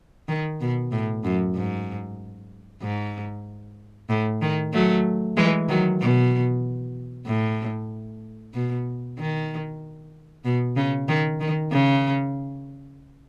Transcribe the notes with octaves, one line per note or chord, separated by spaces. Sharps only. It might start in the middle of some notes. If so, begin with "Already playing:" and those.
D#3
B2
A2
F#2
G#2
G#2
A2
D#3
F#3 A3
E3 G#3
D#3 F#3
B2
A2
B2
D#3
B2
C#3
D#3
D#3
C#3